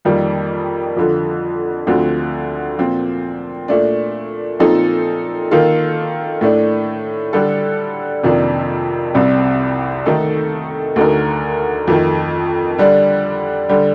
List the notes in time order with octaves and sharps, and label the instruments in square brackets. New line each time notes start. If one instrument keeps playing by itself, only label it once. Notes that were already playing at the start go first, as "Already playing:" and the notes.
[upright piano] F2 D#3 G3 A#3
F2 D3 F3
D2 D3 F3 C4
A#2 F3 C4
A#2 A3 D4
A#2 F3 C4 D#4 A4
D#3 A#3 F4 A4
A2 A3 D4
D3 G3 D4 A4
F2 C3 D#3 A#3 D4
C2 C3 G3 C4
D#3 A3 D#4 A4
D2 D3 A3 D#4 A#4
F2 D#3 A3
D3 G3 D4
D3 G3